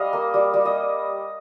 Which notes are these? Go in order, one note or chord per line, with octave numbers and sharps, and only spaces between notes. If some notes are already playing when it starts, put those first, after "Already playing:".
Already playing: G3 D#5 F5
A#3
G3
G3
D#5